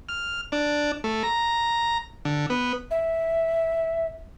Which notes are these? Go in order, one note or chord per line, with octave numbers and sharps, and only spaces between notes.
F6
D4
A3
A#5
D3
B3
E5